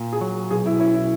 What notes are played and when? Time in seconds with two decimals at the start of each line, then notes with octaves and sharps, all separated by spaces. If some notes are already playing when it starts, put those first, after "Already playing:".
Already playing: A#2
0.13 G#4
0.21 F#3
0.51 B1 G#4
0.66 E4
0.80 C#4 E4
0.94 E4